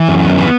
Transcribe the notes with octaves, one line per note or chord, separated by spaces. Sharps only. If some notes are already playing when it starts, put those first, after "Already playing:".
Already playing: E3
F#2
B3
E3